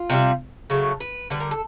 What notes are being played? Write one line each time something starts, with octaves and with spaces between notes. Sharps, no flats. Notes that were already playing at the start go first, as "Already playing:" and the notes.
Already playing: F4
C3 D#3 G3
C#3 F#3 A3
B4
D3 G3 B4
A#4
A4